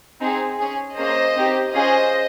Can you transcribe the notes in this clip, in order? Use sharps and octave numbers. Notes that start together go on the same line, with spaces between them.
C4 D#4 G#4
C#4 G#4
A#3 C#4 G#4 C5 D#5
C4 D#4 G4
C#4 F4 G#4 C5 D#5